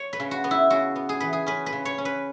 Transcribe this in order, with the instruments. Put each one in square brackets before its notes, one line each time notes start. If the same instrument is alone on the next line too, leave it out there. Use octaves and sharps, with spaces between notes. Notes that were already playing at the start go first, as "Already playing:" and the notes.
Already playing: [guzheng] C#5
B4
C#3
F#4
B3
E4
C#3 F#4
B3
G#4
E3 B4
G#4
C#4 B4
B4
C#3
C#5
C#4
B4